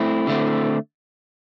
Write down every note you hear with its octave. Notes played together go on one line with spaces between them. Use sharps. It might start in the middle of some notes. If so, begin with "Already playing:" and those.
Already playing: A3 C4 E4
D3 A3 C4